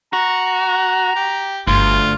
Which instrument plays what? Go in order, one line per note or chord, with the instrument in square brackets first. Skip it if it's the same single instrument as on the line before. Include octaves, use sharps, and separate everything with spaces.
[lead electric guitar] F#4 [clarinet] A#5
[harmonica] G4
[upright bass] G1 [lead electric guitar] D2 [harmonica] F4